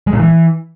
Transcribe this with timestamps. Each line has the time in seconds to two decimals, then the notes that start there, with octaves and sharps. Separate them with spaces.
0.07 G#3
0.13 A#2
0.19 E3